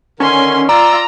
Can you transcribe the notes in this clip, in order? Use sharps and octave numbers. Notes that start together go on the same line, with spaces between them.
D3 D#3 C#4 A#4 G#5 C6
F4 D5 A#5 E6